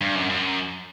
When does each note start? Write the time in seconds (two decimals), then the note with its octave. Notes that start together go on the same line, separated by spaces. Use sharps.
0.01 G2
0.15 F#2
0.30 F#2